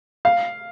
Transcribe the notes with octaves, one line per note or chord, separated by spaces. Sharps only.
F5